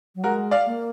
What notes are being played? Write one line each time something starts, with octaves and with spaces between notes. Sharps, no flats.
F#3
G#3 F#4 A#4
D5 F5
A#3